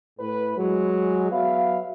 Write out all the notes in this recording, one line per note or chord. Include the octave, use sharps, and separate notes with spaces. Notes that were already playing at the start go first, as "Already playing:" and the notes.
A2 B4
F#3 G#3
F#3 B3 B4 E5 F5